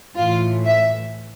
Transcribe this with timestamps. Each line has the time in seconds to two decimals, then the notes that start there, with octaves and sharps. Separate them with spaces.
0.16 A2 E3 F4
0.65 E5